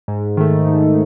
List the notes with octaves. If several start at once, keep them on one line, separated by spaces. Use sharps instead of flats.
G#2
D#3 A3
G#2